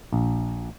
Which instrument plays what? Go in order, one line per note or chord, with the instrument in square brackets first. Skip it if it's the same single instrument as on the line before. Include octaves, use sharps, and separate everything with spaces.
[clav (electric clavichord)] A#1